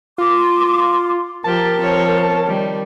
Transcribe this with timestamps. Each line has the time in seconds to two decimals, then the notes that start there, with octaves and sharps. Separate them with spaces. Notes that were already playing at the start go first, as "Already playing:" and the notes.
0.18 F4 C6 D6
1.44 F3 G4 A#4 A5
1.78 F3 C4 C#5
2.45 D#3 G3